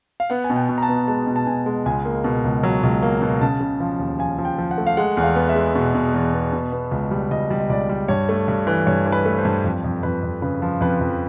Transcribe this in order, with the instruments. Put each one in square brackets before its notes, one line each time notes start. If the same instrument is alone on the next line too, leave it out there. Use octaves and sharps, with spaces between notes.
[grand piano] F5
B3 F#5
G#5
B2
G5
B2
A#5
A5
B3
G#3 A5
B2
A5
B2 G#5
G#3
C#2 G#5
A#3
B2
C#2
F#3
C#2
A#3
B2
C#3 A5
C#3
F3
D#2
F3 G#5
F3
G5
F3
F#5
A3
F5
G#3 F#5
E2
F5
B3
E5
G#3
B2
B2
E2
B3
B2
B3
C#2
G3
C#2 D#5
G3
D#5
C#2 D5
G3
G2 C#5
A3
G2
E3
G2 C#5
E3
B4
A3
C5
G2
F2
F2
F2 B4
F2
C#3 B4
F3
F2 B4
F2